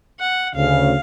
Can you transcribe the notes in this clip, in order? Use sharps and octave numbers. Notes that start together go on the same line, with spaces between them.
F#5
D2 C#3 F5